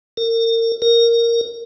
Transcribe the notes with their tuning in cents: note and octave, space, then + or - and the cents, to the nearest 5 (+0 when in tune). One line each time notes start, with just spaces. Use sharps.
A#4 -35
A#4 -5